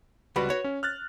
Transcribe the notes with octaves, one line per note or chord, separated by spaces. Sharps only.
C#2 G3 F#4 B4 F#5 B5
C#5
C#4
F6 F#6 A6